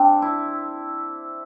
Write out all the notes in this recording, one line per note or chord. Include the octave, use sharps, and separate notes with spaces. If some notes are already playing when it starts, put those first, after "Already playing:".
Already playing: C4 D4
E4